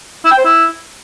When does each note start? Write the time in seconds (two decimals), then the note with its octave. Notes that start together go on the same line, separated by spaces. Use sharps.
0.25 E4
0.31 G5
0.38 C5
0.45 E4